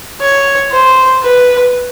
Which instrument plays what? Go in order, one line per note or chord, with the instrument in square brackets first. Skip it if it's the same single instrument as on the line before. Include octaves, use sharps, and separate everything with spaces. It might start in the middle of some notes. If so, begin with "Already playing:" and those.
[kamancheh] C#5
C5
B4